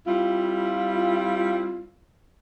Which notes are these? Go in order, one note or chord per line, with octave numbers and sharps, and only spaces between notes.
G3 C4 E4 F4